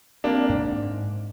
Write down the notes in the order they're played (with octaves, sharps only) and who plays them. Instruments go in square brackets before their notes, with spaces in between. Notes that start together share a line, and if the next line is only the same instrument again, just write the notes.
[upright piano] A#3 D4 [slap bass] C4
[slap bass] G#2